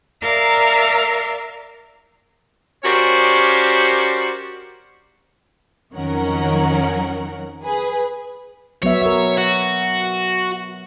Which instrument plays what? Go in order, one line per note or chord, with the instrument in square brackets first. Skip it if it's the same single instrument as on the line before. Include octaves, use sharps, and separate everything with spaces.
[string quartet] A#4 D5 E5 F5 A#5
[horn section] C#4 F#4 G4 A#4 C5 D5
[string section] F2 D#3 F#3 C#4 A#4 F#5
G#4 B4
[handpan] F#3 B3 E5 [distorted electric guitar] C#5
[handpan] A#4 E5
[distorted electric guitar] F#4